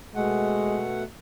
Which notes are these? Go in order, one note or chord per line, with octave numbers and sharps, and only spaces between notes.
B2 G#3 A3 F#5